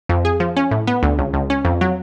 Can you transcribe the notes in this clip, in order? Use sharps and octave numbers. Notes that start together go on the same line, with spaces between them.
F2
G#4
F3
C#4
A2
B3
D2
C#2
C#2
C#4
F2
F#3